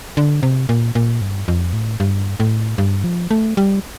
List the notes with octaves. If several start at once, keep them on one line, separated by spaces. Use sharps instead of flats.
D3
C3
A#2
A#2
G2
F2
A2
G2
A2
G2
F3
A3
G3